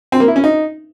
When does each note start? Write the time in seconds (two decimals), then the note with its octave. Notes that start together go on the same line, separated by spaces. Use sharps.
0.12 C4
0.20 A#3
0.28 E4
0.36 C#4
0.44 D#4